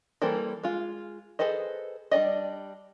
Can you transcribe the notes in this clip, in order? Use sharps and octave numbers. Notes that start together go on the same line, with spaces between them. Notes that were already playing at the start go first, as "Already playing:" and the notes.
E3 G3 A#3 A4 C5
G#3 F4
G#4 A4 B4 C5 D#5
G3 D4 D5 D#5